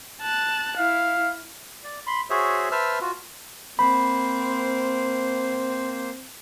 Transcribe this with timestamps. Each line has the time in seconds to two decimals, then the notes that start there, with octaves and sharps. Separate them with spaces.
0.22 A5 F#6
0.77 E4 F5
1.84 D5
2.07 B5 C6
2.30 F#4 G#4 C5 C#5 E5
2.72 B4 C5 E5 A5 E6 F6
3.01 F4 F#4
3.79 A#3 C4 C5 B5